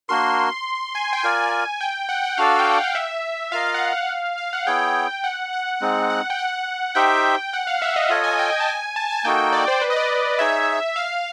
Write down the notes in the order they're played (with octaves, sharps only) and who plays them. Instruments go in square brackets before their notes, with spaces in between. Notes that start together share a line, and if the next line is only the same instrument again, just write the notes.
[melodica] A#3 D4 F#4 A#4 [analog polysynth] C6
[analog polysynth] G#5
G5
[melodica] F4 A#4 D5 [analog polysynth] G#5
[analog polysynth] G5
F#5
F#5
[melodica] D4 F#4 A4 D5 [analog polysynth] F5
[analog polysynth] G5
F#5
F5
E5
[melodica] F4 A#4 D#5 [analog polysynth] F5
[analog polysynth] F#5
F5
F5
F#5
[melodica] B3 E4 G#4 C#5 [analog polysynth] G5
[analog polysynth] F#5
F#5
[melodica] G#3 C4 D#4
[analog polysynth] F#5
G5
F#5
[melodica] D#4 G4 C5 E5 [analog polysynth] G5
[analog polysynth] F#5
F5
E5
D#5
[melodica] F4 A4 C#5 [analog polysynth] D#5
[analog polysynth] G#5
G5
A5
G#5
A5
G#5
[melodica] A#3 D#4 F#4 A4 [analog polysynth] G5
[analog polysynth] D5
C5
B4
D#5
D5
D#5
[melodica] D#4 G#4 C#5 [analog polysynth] E5
[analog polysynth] F5